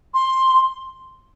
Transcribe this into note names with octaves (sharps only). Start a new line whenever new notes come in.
C6